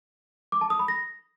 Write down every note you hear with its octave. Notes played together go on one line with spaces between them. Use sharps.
D6
A5
D#6
B5
A#6